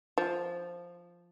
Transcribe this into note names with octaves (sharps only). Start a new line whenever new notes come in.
F3